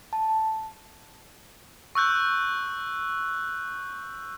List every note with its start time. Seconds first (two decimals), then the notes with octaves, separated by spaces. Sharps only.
0.13 A5
1.95 C#6 E6 F#6 G6